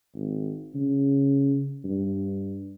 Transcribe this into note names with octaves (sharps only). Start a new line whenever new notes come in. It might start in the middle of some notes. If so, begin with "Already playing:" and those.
G#1
C#3
G2